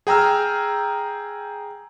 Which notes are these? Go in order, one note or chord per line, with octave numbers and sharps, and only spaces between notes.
G#4 G5 A#5 E6 F6